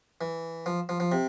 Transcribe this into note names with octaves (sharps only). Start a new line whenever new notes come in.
E3
F3
F3
F3
C3